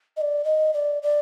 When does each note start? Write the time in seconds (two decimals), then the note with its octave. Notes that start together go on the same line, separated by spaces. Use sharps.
0.17 D#5
0.21 D5
0.44 D#5
0.74 D5
1.03 D5